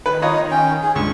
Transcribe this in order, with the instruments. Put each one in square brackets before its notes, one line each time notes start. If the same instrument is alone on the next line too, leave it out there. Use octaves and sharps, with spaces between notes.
[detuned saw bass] D#3 [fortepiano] B4
[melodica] D#4 [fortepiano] F4 C#5 D#5
[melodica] C#4 G5
G#4
[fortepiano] C#2 [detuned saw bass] G2 [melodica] C#6